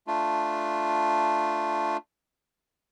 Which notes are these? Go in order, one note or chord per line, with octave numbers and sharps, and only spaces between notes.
A3 D4 F4